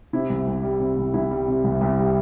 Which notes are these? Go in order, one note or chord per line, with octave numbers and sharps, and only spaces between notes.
C3 E4
C2
C2
G3
C3
C2
C2 E4
G3
C3
C2
C2
G3